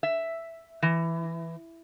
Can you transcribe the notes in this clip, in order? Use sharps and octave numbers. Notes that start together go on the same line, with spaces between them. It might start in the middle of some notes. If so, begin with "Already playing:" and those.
E5
E3